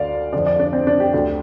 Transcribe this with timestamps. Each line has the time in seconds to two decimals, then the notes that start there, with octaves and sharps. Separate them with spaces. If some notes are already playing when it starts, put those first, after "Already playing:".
Already playing: D2 D3 D5 F5
0.33 F2 D3 D5
0.47 D5
0.59 D4
0.73 C4
0.87 D4
1.00 G4
1.13 D2 D3 G4